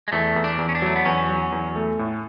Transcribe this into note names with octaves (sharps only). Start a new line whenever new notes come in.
G#3
E2 A3
E2
D4
E2
C#4
D4
F#3 A3
B3
E2 C#4
F#3
E2
A3
A2